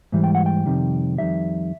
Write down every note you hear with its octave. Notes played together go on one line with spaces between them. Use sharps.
G#2 E3 G3
G5
F#5
G5
F2 C3 D#3 G3
F2 C3 D#3 G3 E5